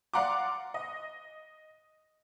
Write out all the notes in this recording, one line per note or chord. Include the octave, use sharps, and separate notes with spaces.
D5 F5 F#5 A#5 C6 D6
D#5